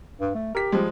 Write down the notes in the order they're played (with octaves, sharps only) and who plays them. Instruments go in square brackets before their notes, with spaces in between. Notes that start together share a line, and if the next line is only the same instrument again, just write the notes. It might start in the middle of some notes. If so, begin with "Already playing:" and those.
[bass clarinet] G2
A3
[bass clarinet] G4 [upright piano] A#4 B6
[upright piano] F3 G3 G#3